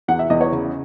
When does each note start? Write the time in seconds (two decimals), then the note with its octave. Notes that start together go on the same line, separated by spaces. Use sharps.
0.08 E2 F#5
0.19 E5
0.30 E2 D#5
0.41 C#5
0.52 C#3